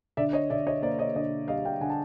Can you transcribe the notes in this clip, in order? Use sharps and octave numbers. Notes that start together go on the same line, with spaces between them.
D3 D5 E5
C#5 D#5
D3 D5 E5
C#5 D#5
A#3 C5 D5
C#5 D#5
D3 C#5 D#5
G3 D#5 F5
F5 G5
D3 F#5 G#5
A5